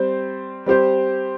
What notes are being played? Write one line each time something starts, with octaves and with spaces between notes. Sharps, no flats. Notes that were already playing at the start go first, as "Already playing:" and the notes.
Already playing: G3 C4 G4 C5
G3 C4 G4 C5